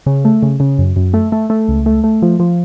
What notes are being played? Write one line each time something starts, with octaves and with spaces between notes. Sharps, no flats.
C#3
A3
C#3
C#3
F#2
F#2
A3
A3
A3
C#2
A3
A3
F3
F3